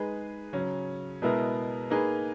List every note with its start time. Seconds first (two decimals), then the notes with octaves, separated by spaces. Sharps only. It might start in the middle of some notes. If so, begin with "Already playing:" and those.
Already playing: G#3 D#4 G#4 B4
0.53 C#3 F#3 C#4
1.22 B2 G#3 B3 E4 A#4
1.90 A#3 D#4 G#4 B4